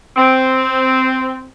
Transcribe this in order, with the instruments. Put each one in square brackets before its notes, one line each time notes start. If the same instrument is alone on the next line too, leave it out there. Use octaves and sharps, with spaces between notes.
[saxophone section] C4